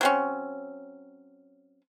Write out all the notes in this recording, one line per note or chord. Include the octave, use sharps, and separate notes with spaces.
F#3 C4 C#4